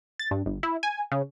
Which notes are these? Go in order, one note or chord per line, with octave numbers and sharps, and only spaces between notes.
A6
G2
G1
E4
G#5
C#3